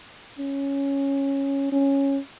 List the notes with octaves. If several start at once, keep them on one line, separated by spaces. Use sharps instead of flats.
C#4
C#4